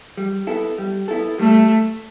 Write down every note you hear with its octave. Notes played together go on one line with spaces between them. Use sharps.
G3
B3 E4 A4
G3
B3 E4 A4
G3 A3